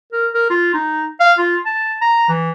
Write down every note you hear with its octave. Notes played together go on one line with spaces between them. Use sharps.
A#4
A#4
F4
D#4
F5
F4
A5
A#5
E3